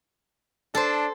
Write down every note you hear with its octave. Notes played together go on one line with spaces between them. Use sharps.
D4 A4 C5